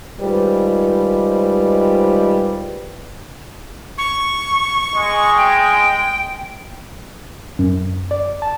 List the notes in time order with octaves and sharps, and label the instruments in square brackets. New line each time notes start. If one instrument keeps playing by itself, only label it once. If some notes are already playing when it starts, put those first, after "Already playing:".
[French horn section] D#3 G3 G#3 F4 B4 C5
[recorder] C#6
[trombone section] G#3
[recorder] G5
[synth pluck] F#2
D5
A5